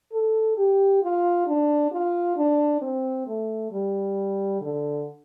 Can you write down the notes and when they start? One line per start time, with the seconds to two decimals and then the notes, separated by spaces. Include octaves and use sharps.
0.12 A4
0.57 G4
1.02 F4
1.47 D4
1.92 F4
2.37 D4
2.82 C4
3.27 A3
3.71 G3
4.61 D3